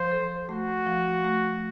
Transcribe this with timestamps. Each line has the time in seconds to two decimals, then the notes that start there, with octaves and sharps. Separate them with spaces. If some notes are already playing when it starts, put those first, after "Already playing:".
Already playing: F3 C5
0.11 A4
0.49 A3 F#4
0.87 F3
1.24 A3